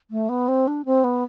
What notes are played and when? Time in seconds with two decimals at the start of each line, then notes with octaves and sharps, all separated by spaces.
0.11 A3
0.29 B3
0.48 C4
0.68 D4
0.85 C4
1.04 B3